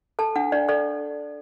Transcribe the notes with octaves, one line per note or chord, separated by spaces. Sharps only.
A4 A5
D4 F#5
D4 D5
A4 D5